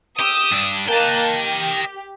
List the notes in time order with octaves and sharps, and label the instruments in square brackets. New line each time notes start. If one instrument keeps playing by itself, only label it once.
[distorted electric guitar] G4 [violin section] D#6 E6
[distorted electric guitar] G2 D4
[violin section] A#3 A5 F#6 [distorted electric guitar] D#5 G5
[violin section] G4